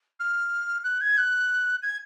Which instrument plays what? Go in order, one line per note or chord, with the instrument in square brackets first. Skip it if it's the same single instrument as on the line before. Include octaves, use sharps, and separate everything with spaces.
[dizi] F6
F#6
G#6
F#6
G#6